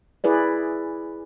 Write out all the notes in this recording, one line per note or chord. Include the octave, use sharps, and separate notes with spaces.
E4 G#4 B4 D5